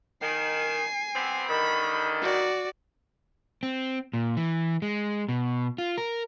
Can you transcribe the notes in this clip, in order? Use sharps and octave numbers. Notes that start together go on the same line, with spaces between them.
D#3 G#5 C7
G3 B3 C4
G2 D3 D#3 B5
F#4 D5
C4
A#2
E3
G#3
B2
F4
A#4